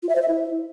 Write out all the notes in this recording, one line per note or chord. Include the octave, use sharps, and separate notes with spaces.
F4
E5
C5
E5
E4